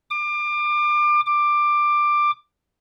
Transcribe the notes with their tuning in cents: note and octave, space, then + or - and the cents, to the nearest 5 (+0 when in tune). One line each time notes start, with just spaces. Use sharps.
D6 +30
D6 +15